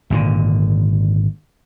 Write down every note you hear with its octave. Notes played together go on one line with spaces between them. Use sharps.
G#1 A#2 D3